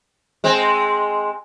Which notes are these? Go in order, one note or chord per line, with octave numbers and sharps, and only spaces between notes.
G#3 C4